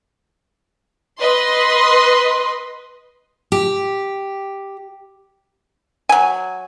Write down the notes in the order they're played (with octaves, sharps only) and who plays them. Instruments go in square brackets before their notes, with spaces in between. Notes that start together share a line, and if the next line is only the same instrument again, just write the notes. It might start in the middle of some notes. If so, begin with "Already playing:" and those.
[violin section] B4 D#5 C6
[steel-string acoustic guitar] G4
[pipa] F#3 G#5